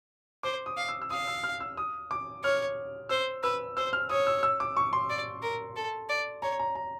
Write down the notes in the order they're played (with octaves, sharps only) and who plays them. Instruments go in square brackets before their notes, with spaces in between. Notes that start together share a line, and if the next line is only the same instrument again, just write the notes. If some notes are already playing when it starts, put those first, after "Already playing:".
[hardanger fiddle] C5 [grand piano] D6
[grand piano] D#6
[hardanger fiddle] F5
[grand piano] E6
E6
[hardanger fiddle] F5 [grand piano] D#6
[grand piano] E6
F6
E6
D#6
D6
[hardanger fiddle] C#5 [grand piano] F6
[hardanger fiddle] C5 [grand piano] E6
[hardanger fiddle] B4 [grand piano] E6
[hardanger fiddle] C5 [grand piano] E6
[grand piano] F6
[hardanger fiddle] C#5 [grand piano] D#6
[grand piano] E6
E6
D6
C#6
C6
[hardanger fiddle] D5
A#4
A4
D5
[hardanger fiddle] C#5 [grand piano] A#5
[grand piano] A#5
A#5